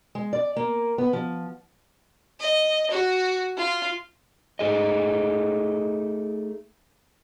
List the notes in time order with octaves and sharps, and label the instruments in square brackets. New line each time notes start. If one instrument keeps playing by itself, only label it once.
[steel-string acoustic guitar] G#3
D5
A#3
B3
F3
[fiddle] D#5
F#4
F4
[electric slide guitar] A3 D#4 G#4 D#5